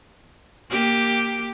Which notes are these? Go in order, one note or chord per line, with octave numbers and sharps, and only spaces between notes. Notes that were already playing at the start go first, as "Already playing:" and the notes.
A#3 G4